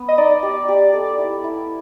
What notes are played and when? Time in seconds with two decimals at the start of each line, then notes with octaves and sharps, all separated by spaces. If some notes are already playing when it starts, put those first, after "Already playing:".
Already playing: B3
0.08 D#5
0.18 D#4 D5
0.43 G4
0.68 G4
0.93 A4
1.18 E4
1.44 E4